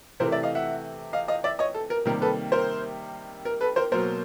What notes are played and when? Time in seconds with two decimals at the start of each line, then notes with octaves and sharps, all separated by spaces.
0.20 C3 E3 A3 A#4 C5
0.32 D5 E5
0.43 D#5 F5
0.55 E5 F#5
1.13 D#5 F5
1.28 D#5 F5
1.44 D5 E5
1.59 C#5 D#5
1.74 A4
1.90 A#4
2.05 C3 D#3 G3 A#3 A#4
2.22 A4 B4
2.52 A#4 C5
3.45 A#4
3.61 A4 B4
3.76 A#4 C5
3.92 B2 F#3 A#3 A#4 C5